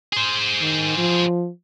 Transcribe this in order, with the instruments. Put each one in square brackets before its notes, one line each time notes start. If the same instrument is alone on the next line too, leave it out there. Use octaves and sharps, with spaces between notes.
[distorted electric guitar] G#4 C5
[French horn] D#3
F3